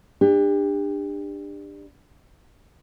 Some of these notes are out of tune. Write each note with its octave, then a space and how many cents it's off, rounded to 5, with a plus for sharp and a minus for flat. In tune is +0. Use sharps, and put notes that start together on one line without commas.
D4 +20 G4 +35